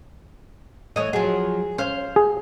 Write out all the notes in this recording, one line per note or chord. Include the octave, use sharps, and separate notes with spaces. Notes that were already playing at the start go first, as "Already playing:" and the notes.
E3 A3 C#5 D#5
F3 F#3 G#4
C#4 C5 F5
G#4